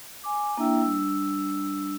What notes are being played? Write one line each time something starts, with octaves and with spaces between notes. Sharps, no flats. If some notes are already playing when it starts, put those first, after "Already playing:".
G#5 D6
A#3 D4 E4 E5 G5 E6
G3 D4 E6